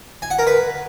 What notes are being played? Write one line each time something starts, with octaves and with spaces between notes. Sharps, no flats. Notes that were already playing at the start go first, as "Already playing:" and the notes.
G#5
F#5
A#4
B4